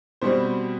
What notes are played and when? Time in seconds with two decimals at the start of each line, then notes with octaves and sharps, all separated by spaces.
0.22 B2 G3 C4 C5